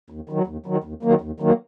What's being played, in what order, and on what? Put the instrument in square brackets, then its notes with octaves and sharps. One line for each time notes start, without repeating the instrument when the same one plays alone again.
[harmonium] D#2
D#3 F#3
D#2
D#3 F#3
D#2
D#3 F#3 A#3
D#2
D#3 F#3 A#3